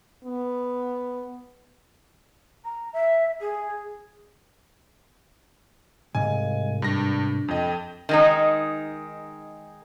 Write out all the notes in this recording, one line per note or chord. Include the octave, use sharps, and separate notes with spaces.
B3
A#5
E5
G#4
C2 G#2 D#5 F5 G#5
G2 D4 A#6
F2 A4 D#5 G5
D#3 G#3 D#4